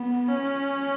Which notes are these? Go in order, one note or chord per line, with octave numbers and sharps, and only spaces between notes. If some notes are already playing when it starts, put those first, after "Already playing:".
Already playing: B3
C#4